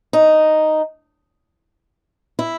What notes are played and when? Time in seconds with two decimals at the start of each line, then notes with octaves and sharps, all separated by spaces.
0.13 D#4
2.39 E4